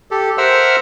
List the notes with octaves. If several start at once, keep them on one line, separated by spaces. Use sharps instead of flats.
G4 A4
A#4 C5 E5 F#5 E6 F6